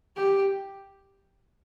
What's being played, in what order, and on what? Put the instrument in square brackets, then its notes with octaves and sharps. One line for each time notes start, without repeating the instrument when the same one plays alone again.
[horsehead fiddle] G4